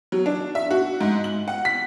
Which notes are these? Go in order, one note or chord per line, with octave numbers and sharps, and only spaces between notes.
F#3
D4
E5
F#4
G#2
F#7
F#5
B6